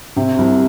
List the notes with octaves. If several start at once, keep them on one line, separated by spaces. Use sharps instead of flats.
C3
C2